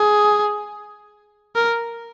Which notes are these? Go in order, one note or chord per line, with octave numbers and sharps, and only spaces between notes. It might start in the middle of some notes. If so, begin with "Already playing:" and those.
Already playing: G#4
A#4